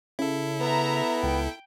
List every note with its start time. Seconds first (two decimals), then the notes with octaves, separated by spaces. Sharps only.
0.19 C#3 E4 A4
0.60 B3 E5 A#5
1.23 C#2 G5